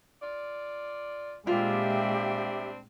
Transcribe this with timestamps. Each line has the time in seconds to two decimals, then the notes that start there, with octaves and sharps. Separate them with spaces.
0.22 F4 D5
1.47 A#2 G3 G#3 C4 D4 F4 G4 E5